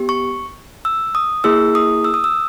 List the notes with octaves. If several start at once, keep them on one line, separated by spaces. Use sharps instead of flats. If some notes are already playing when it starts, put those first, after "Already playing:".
Already playing: B3 G4
C#6
E6
D#6
A#3 E4 G#4 E6
D#6
E6
D#6
E6